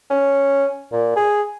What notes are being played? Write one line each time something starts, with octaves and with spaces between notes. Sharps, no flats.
C#4
A#2
G#4